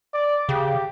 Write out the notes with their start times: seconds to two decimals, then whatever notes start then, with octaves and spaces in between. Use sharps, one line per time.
0.14 D5
0.49 C#3 G4